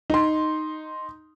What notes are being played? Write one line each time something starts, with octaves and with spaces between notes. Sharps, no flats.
D#4 C6